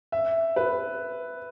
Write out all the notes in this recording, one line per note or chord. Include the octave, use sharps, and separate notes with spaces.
E5
B4